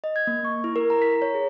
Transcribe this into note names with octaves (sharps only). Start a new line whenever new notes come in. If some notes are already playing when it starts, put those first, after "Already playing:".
D#5
G#6
A#3
C#6
E4
A#4
A#5
B6
C#5
G#4